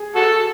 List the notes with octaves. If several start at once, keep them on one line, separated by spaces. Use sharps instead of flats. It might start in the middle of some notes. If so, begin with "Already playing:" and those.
Already playing: G#4
F#4 A4